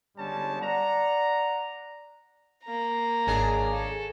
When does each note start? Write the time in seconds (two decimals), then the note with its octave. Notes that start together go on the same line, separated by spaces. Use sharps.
0.18 G1 G2 G3 G#3 C#4 A5
0.61 D5 F#5 A#5
2.64 A#3 A#5
3.27 G#1 C#4 D4 G#4
3.74 A4